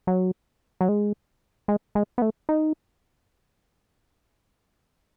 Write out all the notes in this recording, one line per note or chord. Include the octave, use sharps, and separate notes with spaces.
F#3
F#3
G#3
G#3
G#3
B3
A3
D#4